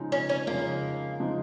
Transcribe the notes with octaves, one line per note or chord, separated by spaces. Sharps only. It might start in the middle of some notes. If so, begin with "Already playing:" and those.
Already playing: C#3 F3 G#3 D#4
C#4
C#4
C#3 F3 G#3 A#3 D#4
C#3 F3 G#3 D#4